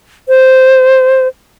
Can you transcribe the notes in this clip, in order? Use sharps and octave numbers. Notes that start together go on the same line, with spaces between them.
C5